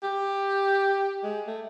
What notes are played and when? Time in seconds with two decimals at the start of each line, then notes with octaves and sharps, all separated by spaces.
0.03 G4
1.23 G#3
1.47 A3